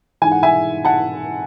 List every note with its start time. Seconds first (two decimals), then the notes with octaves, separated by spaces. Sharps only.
0.22 G#2 E3 G#5
0.32 F#5
0.43 E5 G#5
0.85 F#5 A5